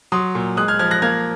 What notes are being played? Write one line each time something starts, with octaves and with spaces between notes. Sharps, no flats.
F#3 C6 D#6
A#2
G#3 D#6 F#6
F6 G#6
F3 F6 G#6
F#6 A#6
A#3 F6 G#6